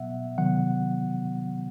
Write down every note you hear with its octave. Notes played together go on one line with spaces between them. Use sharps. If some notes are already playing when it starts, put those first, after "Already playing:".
Already playing: B2 F#3 B3 E5 F#5
C3 D#3 F#3 B3 F#5